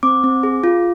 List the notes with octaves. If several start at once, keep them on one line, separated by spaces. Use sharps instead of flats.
C4 D6
C4
G#4
F4